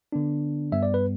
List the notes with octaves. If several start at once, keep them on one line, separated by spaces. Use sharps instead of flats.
D3 B3 D4
G2 G3 B3 E5
D5
B4